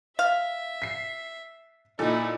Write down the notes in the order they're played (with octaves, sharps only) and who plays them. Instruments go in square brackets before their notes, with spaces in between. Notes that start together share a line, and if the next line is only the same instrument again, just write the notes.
[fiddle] E5 [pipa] F5
[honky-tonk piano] B6 C7
[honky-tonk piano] A#2 A4 [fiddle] D#4 E4